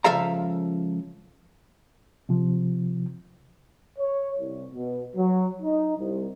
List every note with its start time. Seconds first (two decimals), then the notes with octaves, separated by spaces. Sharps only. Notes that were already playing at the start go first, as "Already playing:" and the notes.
0.04 C#2 F3 A4 E5 F5 A#5
2.29 C3 F3
3.99 C#5
4.39 C2
4.74 B2
5.16 F#3
5.63 D#4
5.98 C2